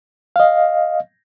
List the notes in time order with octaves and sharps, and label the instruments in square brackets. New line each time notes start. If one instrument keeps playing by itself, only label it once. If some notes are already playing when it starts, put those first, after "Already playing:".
[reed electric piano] D#5 F5